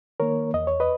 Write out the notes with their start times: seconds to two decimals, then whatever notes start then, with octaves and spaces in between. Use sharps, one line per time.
0.20 D#3 A#3 A#4 C#5
0.54 E2 D#5
0.67 C#5
0.80 B4 D#5